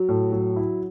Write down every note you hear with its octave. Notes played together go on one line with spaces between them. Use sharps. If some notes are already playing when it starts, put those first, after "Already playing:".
Already playing: F#3
A2
F#3
E4